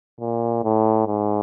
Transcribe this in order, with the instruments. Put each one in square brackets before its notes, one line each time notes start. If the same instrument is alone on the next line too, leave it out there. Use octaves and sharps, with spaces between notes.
[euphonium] A#2
A2
G#2